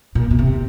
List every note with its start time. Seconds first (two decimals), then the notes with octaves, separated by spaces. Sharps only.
0.15 A#2
0.31 B2
0.39 C3